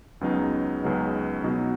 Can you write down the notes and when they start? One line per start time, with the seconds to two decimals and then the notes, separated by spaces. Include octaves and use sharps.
0.21 C#2 C#3 F#3 B3 D#4
0.83 C#2 C#3 F#3 B3 D#4
1.44 B2 F#3 B3 D#4